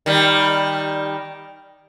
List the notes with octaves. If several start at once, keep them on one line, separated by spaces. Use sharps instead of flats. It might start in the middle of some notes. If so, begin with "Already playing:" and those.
D#3 G3